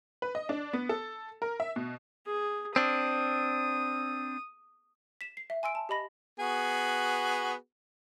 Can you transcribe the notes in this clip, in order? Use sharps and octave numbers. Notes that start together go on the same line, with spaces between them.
B4
D#5
D4
B3
A4
A#4
E5
B2
G#4
C4 D4 D#6
B6 E7
C7
E5
G#5 C6 E6 D7
A5
G4 D#5 B5 A#6
B3 F#4 G#4